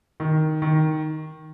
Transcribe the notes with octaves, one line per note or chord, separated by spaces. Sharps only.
D#3
D#3